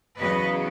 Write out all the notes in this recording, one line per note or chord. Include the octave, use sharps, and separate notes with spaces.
E2 C#3 F#3 B3 B4 D#5